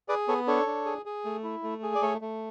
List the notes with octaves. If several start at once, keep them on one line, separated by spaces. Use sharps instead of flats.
G#4 B4 D5
B3 A4 C#5
D4 A4 C#5
D4
G#4
G#4
A3
E4
A3
G#4
D5
A3 A4 C#5
A3